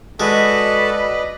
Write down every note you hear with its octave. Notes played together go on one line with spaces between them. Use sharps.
G#3 F#4 A4 B4 D5 D#5 A5